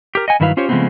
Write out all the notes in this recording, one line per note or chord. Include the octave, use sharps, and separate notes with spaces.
G4 A#4
D#5 F#5 G#5
G2 D#3 F#3 E4 B4 F5
C#4 F4 G4 C5 C#5
C#3 F3 G#3 A3 B3 C4